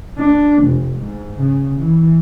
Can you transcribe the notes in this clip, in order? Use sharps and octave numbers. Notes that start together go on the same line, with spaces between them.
D4
F1
G#2
C#3
E3